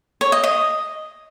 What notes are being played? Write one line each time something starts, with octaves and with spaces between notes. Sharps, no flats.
C#5
D#5
D#5